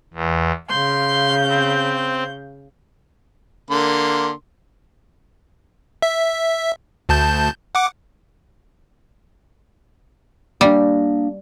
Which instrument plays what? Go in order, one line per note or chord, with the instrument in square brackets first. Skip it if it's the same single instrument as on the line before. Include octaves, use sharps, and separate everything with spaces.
[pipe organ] E2
[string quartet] C#3 F5 G6 [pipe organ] C6
[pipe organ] C4
[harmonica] D3 A#3 C6
[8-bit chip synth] E5
D2 A5 G6
F#5 D6
[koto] G3 [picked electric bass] A#3 D4